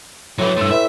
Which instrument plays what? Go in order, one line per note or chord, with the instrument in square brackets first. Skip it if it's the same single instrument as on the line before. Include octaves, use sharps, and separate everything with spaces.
[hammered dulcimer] A2 B4 [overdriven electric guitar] E3 F#3
[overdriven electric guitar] G2 A3 [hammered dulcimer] E5 C6
[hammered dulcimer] E3 [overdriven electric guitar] E5